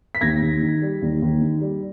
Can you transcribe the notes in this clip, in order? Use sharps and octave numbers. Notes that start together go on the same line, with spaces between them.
B6
D#2 G#6 A#6
D#2
D#3
G3
D#2
D#2
D#3
G3